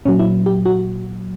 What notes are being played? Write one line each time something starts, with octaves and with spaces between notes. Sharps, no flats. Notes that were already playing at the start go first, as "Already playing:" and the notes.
A#2 F#3 C#4
E4
G4
F#4